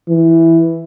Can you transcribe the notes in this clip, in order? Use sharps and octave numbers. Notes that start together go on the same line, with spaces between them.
E3